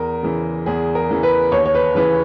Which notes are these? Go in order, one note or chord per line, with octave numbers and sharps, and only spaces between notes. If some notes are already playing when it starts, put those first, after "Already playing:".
Already playing: E2 A#4
C#3 E3
E2 G#4
A#4
C#3 E3
B4
D#2 C#5
C#5
B4
C#3 E3 B4